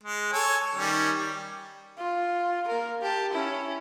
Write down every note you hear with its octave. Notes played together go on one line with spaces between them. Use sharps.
G#3
A4 C#5 G#5
D#3 G3 C#4
G3
F4
A#3 A#4
G4 A5
C#4 E4